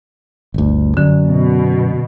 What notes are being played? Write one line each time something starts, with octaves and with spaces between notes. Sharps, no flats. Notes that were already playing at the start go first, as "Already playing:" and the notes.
G1 D2
F#2 D3
B2